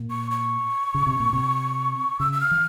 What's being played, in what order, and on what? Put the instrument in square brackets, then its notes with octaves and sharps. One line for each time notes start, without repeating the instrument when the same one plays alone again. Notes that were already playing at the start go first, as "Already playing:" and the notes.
Already playing: [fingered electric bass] A#2
[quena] C#6
C#6
[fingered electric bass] C#3
C3
A#2
C3
[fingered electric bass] C#3 [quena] E6
[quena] E6
F6
[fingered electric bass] E3